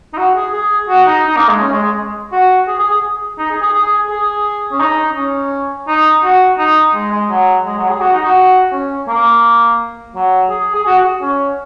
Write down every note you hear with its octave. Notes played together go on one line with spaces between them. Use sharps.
D#4
F#4
G#4
G#4
F#4
D#4
D#4
A#3
G#3
C#4
G#3
G#3
F#4
G#4
G#4
G#4
D#4
G#4
G#4
G#4
G#4
C#4
D#4
C#4
D#4
F#4
D#4
G#3
G#3
F#3
G#3
F#3
G#4
F#4
D#4
F#4
C#4
A#3
F#3
G#4
G#4
F#4
F#4
C#4